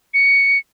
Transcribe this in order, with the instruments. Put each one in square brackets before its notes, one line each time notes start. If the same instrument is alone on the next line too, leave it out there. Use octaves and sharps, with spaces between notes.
[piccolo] C#7